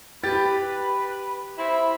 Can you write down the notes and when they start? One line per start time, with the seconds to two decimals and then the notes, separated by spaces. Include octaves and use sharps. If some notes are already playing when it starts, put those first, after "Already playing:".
0.23 G4 B4 A6
1.57 C4 E4